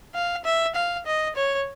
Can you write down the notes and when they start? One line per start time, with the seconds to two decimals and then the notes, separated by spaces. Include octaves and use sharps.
0.15 F5
0.45 E5
0.75 F5
1.06 D#5
1.36 C#5